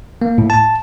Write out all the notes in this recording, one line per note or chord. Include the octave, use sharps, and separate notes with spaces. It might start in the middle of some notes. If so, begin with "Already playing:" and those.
A#3
A2
A5